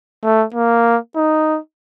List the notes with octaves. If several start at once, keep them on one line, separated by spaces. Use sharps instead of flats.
A3
A#3
D#4